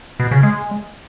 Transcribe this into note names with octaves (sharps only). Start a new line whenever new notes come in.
B2
C#3
G#3